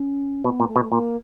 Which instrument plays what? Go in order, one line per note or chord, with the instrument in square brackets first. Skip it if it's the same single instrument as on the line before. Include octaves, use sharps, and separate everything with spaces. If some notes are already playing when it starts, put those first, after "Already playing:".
Already playing: [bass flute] C#4
[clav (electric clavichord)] B2 [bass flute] B3
[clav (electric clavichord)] A#2
[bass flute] A3
[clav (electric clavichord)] B2
[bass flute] A3
[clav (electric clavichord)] A#2 [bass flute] A#3